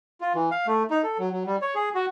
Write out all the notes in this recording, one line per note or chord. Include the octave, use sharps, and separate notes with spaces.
F4
E3
F5
A3
D#4
A4
F#3
F#3
G3
C#5
G#4
F#4